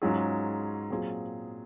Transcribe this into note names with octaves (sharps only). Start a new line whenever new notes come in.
G#2 F#3 C#4 F4 G#4
A#2 F#3 C4 F4 G#4